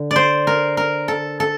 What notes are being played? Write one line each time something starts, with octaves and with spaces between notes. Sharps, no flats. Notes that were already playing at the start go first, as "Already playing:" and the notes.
Already playing: D3
C5 D5
A#4
A#4
A4
A4